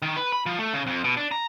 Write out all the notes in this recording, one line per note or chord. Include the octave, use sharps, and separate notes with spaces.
D#3
B4
B5
F3
A3
C#3
F2
B2
D4
A#5